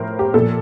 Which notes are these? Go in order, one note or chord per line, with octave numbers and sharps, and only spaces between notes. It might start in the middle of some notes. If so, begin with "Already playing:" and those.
Already playing: A2 F3 A#4 C5
G4
A#2 F3 A4